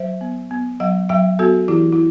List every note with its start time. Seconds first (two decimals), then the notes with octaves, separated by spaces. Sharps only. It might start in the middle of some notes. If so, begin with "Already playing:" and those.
Already playing: F#3 C5 E5
0.21 B3
0.51 B3
0.80 F#3 D#5 F#5
1.09 F#3 E5 G5
1.39 B3 F#4 A4
1.68 E3 E4 G4
1.93 E4